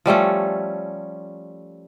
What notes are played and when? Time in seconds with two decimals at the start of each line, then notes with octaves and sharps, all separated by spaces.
0.06 F3 G3 A3 C#4